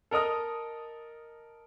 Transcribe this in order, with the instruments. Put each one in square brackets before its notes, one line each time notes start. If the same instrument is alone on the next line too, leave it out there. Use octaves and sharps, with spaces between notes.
[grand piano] A4 A#4 D#5 D#6 F6